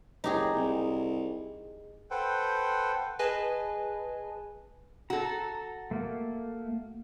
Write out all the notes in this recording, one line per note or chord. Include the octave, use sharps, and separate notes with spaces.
F#1 D#4 G4 G#4
C2
A4 B4 C5 F#5 G5
G#4 B4 D#5 G#5 A5
F#4 A4 A#5
A3 A#3